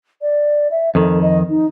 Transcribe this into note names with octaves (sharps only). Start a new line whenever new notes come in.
D5
E5
F2 D#3 A4
D#5
D#4